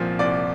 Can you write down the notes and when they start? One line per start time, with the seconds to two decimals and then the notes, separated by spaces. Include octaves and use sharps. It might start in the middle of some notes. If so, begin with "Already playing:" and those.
Already playing: C2 A#2 F3 C4
0.19 C2 D5